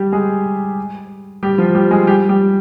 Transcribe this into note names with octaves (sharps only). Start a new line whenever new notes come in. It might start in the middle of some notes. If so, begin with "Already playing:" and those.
Already playing: G3 G4
G#3 G#4
G3 G4
F3 F4
G3 G4
G#3 G#4
G3 G4
G3 G4